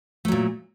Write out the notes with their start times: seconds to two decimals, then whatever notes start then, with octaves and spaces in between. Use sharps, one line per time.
0.25 A3
0.28 F#3
0.32 A#2